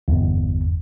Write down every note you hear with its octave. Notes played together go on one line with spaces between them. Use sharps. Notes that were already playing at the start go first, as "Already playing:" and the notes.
G1 E2